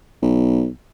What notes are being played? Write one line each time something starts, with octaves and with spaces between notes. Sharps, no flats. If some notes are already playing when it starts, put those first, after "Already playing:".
B1